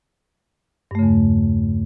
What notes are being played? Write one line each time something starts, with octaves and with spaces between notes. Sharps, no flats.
E2 G2 C#3 A3